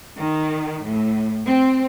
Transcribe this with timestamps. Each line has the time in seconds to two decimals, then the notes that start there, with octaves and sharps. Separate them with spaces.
0.18 D#3
0.85 A2
1.46 C4